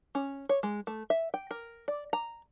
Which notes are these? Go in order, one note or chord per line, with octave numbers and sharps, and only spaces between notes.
C#4
C#5
G#3
A3
E5
G5
A#4
D5
A#5